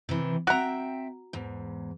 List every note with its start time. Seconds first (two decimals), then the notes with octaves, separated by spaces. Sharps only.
0.09 C3 D#3 E3
0.47 C4 F#4 E5 G5 A#5
1.33 E2 G#2